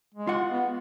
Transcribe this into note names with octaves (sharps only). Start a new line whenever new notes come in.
G#3
F4 F#5
B3